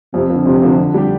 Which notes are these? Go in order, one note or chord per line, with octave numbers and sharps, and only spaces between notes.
F2 C3
D3 F3
F2 C3
D3 F3
D3
G3 D4 G4